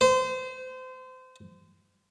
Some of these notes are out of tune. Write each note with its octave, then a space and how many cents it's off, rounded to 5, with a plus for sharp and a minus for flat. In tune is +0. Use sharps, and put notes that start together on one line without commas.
C5 -30